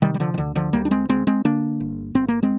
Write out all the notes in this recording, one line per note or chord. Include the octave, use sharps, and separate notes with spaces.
C3 D#3 G3
G3
D3 F3
D#3
D2 D3
D3 F3
D2 G3 A#3
D4
G#3 C4
D2 G#3 C4
G#3 C4
D3 A#3 D4
G1
G1 C4
A#3
G#3 C4